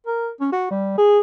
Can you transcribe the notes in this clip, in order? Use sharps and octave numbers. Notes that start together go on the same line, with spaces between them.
A#4
C#4
F#4
G3
G#4